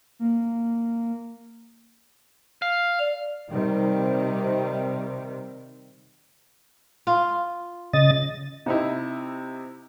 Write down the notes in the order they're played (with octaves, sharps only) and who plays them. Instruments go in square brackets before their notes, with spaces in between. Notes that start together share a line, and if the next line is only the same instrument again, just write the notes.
[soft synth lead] A#3
[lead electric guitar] F5
[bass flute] D5
[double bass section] C3 D#3 G3
[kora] F4
[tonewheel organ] C#3 D#5 A6
[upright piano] C3 D#4 E4